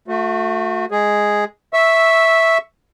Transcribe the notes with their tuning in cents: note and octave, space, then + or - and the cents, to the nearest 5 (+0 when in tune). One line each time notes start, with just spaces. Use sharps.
A3 +10 F#4 -35
G#3 +0 G#4 +0
E5 -5 C#6 +0 E6 +0